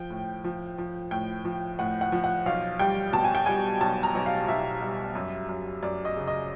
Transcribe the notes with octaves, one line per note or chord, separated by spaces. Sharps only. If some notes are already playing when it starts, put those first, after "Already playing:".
Already playing: F3 G5
A2
F3
F3
A2 G5
F3
A2 F#5
F#5
F3
F#5
B1 F5
G3 G5
B2 A5
G#5
G5
G3 G#5
B1 A5
A#5
B1
F5
B1 E5
G3
F#2
F#2
F#2 D5
D#5
C#3
D#5